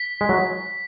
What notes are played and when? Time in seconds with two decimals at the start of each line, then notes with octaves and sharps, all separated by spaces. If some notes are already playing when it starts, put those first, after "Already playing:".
Already playing: B6
0.21 G#3
0.29 F#3